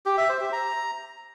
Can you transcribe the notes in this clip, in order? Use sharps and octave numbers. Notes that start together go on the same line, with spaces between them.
G4
E5
C5
G4
A#5